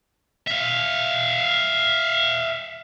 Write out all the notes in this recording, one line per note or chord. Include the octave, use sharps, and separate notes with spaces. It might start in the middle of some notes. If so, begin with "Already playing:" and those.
E5 F5